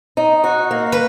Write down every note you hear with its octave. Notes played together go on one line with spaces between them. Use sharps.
D#4
F#4
A#3
B4